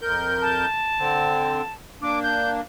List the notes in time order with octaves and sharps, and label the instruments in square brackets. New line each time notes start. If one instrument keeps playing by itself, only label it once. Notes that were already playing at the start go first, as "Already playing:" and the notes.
[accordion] F2 A#4 G6
[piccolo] A5
[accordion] D3 C4
[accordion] A#3 D4 [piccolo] D6
[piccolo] G6